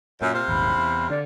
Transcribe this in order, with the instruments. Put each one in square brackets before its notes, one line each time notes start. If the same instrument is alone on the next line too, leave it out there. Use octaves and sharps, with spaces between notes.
[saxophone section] F#2 [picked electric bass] A#2
[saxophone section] C3 C5 F5
[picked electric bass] D#1 G#1 D#2 [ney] B5
[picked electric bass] E2
[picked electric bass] D3 [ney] D5